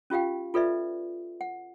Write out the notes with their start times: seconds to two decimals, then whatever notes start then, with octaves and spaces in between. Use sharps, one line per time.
0.10 C#4 F4 G4 F5 G5
0.54 F4 A4 B4 D5 E5
1.41 F#5